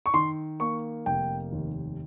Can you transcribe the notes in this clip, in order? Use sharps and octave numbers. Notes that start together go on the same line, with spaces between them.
C#6
D#3 C6
A#3 C#6
F1 G5
D#2